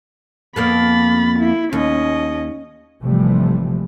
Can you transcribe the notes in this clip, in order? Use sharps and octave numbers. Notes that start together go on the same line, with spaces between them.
F2 A#3 B3 B5 A6
E4
D#2 C#4 D#5
G#1 C3 E3 F3 G3 A3